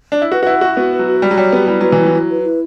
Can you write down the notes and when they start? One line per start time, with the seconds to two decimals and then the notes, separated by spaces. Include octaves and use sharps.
0.12 D4
0.22 E4
0.32 F#4 B4
0.43 F#4
0.47 E4 F#5
0.61 F#4 C#6
0.76 B3 F#4
0.92 B4
0.99 F#3
1.08 F#4
1.22 G3 G4
1.31 F#3
1.37 G3 C#5
1.52 B3 G4
1.68 G3 E4
1.81 F#3 B4
1.92 E3
1.98 E4
2.05 F#3
2.13 E4
2.29 B4
2.43 E4